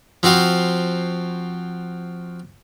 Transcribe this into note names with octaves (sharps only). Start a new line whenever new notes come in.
F3 C4 F#4 F5